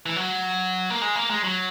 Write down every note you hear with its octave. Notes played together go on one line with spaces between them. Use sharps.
E3
F#3
A#3
G#3
A#3
G#3
F#3